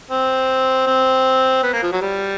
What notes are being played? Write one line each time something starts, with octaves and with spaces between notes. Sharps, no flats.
C4
C4
B3
A#3
F3
F#3
G3